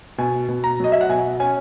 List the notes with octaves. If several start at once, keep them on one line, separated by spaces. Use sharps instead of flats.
B2 G#5
B2
A#5
F#3 D#5
E5
F#5
B2 G#5
C#4 G#5